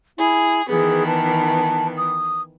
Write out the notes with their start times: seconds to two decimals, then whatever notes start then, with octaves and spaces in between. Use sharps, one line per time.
0.18 E4 G#4
0.69 D#3 E3 B3 G#4
1.07 A5
1.97 D#6